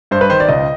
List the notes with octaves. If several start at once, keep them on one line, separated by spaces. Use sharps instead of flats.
G2 C5
B4
D#3 C5
D5
C#2 D#5